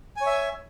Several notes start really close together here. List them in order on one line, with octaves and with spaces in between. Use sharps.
G#5 C#5 E5